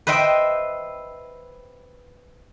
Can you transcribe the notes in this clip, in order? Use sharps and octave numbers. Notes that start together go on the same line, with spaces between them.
B4 C5 D#5 E5 G5